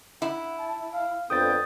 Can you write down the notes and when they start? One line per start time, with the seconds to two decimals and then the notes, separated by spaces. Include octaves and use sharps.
0.22 E4 F#5
0.59 A5
0.92 F5
1.30 F2 D3 B3 G5 D#6 A6